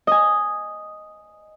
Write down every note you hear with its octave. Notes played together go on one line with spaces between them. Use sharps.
D#5 G#5